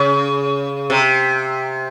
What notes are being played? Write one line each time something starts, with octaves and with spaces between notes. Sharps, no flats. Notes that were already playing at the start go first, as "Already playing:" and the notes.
Already playing: C#3
C3